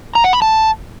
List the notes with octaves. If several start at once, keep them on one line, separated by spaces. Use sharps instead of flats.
A#5
F#5
B5
A5